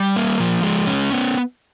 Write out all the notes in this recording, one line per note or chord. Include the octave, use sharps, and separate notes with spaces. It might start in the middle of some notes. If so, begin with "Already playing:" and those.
Already playing: G3
A#3
F3
G#3
C#4
B3